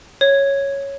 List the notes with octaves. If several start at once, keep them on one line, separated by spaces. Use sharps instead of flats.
C#5